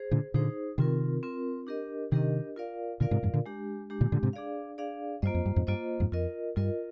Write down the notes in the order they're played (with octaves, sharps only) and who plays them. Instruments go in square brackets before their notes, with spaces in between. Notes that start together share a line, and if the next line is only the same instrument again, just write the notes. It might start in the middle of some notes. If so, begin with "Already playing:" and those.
Already playing: [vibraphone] G#4 C5
[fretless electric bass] A#2 D3
[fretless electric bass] A#2 D3 [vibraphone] D#4 G#4 C5
[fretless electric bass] C3 D#3 [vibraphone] C4 F4 A#4
[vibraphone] C4 F4 A#4
D4 G4 A#4 D#5
[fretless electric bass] C3 D#3 [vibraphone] D4 G4 A#4 D#5
[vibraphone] F4 A#4 D5 F5
[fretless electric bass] A#2 D3 [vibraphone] F4 A#4 D5 F5
[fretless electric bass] G#2 C3
F2 G#2
A#2 D3
[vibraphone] G#3 D4 G4
G#3 D4 G4
[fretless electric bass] A#2 D3
A#2 D3
G#2 C3
[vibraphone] D4 G#4 D5 F5
D4 G#4 D5 F5
[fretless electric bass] G2 [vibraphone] A#3 F4 C5 D#5
[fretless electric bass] F2
G2
F2 G#2
[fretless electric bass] G2 [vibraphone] A#3 F4 C5 D#5
[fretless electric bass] F2 G#2
[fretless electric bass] F2 [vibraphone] F4 A#4 D#5
[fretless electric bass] G2 [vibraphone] F4 A#4 D#5